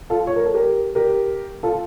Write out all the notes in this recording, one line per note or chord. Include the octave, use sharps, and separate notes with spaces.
F4 A4
C#5
A#4
A4
G4 A#4
G4 A#4
F4 A4